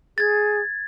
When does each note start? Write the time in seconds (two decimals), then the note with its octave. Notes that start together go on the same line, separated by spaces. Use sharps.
0.18 G#4 G#6 A6